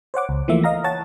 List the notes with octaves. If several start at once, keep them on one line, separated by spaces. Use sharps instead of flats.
C5 C#5 F#5 D6
C#2
E3 F3 A3 A#3 E5
D#5 F5 A#5 A#6
C#5 F#5 A5 A6